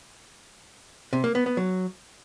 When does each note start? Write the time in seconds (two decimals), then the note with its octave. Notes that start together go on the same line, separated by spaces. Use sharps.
1.13 C3
1.24 A#3
1.35 B3
1.46 B3
1.57 F#3